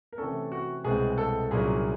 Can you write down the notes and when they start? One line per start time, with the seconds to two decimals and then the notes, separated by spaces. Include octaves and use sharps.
0.13 A#4
0.18 C3 E3 A3 C#4 A4
0.52 F#4
0.84 C2 B2 G#3 C4 G#4
1.18 A4
1.51 C2 A#2 F#3 A#3 C#4 G#4